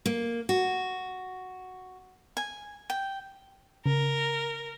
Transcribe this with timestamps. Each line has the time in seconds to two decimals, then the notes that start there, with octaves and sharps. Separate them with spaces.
0.06 A#3
0.49 F#4
2.37 G#5
2.90 G5
3.86 C#3 A#4